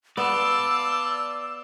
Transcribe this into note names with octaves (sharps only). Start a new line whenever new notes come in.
B3 F4 D5 A5 E6